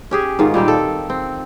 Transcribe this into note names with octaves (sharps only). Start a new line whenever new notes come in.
C#4 G4 G#4
G#2 D#3 F4
A#2 G3 C4 G4
A4
C4